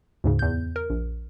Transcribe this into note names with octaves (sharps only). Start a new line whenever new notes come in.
D2 G#2 C#3
E2 G6
A#4
A#1